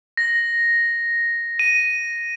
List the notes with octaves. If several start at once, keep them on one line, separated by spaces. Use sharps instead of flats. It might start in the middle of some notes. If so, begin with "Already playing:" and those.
A#6
D#7